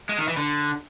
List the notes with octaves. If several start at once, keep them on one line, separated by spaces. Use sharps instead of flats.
G#3
D#3
E3
D3